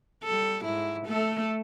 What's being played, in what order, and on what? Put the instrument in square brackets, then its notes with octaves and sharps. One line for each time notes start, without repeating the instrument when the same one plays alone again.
[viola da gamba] G3 A4
G#2 E4
A3 A4